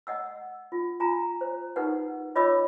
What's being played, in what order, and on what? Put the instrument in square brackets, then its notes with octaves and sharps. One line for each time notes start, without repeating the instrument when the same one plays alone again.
[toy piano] D#5 F#5 E6
F4
F4 G#5 A#5
C5
D#4 G4 A#4 B4 F#5
F4 C#5 D#5 B5 D6 E6